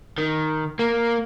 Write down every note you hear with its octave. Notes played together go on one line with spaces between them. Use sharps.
D#3
A#3